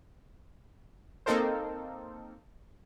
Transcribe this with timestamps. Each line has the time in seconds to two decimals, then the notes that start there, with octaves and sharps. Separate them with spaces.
1.26 A#3 C4 D#4 A4 A#4 C5